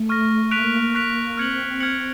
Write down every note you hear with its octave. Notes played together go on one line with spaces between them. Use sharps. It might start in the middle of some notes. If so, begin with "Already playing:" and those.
Already playing: A3
C#6 F6 A#6
A#3 C#6 F#6 B6 D7 F7
C#6 F#6 B6 D7 F7
C4 F6 G#6 C#7 F#7
F6 G#6 C#7 F#7